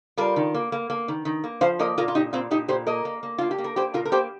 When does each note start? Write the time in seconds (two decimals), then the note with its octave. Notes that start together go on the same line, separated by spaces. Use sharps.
0.17 G3 F4 A#4
0.36 D#3
0.54 A#3
0.72 A#3
0.90 A#3
1.08 D#3
1.25 D#3
1.44 A#3
1.61 F3 C5 F5
1.79 A#3 A#4 D#5
1.98 A#2 F4 A#4
2.08 F4
2.15 A#2 D#4 G4
2.33 A#2 C4 F4
2.51 A#2 D#4 G4
2.68 A#2 G4 C5
2.87 A#3 A#4 D#5
3.05 A#3
3.23 A#3
3.38 A#3 F4
3.51 G4
3.58 A#3
3.64 A#4
3.76 A#3 G4 C5
3.94 A#2 F4 A#4
4.05 A#4
4.12 A#3 G4 C5